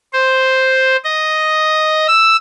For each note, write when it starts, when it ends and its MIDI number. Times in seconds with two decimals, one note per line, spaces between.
0.13 0.96 72
1.04 2.07 75
2.08 2.37 88